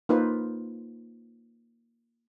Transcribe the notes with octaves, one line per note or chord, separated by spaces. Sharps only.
A#3 D#4 F4 B4 C5